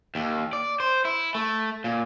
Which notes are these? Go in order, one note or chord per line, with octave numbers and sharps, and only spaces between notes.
D#2
D5
C5
E4
A3
A#2